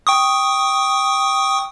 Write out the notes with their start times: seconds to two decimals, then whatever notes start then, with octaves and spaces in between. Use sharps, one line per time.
0.07 G5 C#6 D#6